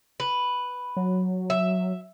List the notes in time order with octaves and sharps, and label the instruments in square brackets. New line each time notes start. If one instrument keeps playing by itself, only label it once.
[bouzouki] B4
[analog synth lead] F#3
[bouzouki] E5